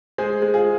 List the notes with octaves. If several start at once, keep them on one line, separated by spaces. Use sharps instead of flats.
G#3 G#4 C5
G#3
F4 G#4